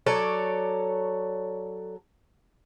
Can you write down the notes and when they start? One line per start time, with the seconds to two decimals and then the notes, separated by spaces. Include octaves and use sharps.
0.06 F#3 A4 C#5 D5